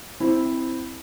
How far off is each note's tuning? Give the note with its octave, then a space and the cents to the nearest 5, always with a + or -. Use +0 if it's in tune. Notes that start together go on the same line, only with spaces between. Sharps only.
C4 +0 E4 -5